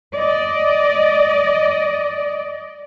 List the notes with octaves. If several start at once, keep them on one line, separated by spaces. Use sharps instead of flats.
D5 D#5